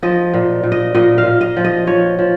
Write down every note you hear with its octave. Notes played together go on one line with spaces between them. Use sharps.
F3 D#5
A#2
A#2
D#5
A#2 D#5
F5
A#2
D#5
F3
D#5
F3 C#5
F3